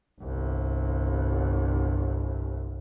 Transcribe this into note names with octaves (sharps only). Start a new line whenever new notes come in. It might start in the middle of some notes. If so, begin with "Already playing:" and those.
G1 C2